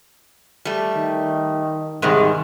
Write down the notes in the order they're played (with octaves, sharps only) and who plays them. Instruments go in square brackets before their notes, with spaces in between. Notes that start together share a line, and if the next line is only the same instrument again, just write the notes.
[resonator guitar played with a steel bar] G3 A3
[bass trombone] D#3
[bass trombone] G#2 [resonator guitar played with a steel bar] C3 D#3 G3